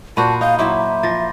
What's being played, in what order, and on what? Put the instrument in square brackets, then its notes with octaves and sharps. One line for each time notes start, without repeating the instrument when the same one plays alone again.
[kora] A#2 F#4 C5 [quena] A5 [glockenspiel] B5 D#7
[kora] D#4 [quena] F5 [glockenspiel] A#5 G6
[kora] F#3 E4 [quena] E5 [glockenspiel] B5 C6 D6
[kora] F3 [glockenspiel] A6 A#6